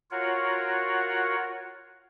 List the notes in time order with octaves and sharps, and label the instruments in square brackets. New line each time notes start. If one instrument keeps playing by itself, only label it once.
[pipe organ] F4 F#4 A#4 C#5 F#5